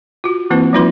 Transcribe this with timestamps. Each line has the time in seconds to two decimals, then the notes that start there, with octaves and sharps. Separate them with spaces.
0.24 F4 F#4
0.50 E3 A#3 C4 E4 B4
0.73 F3 G3 D#4 F4 B4 C6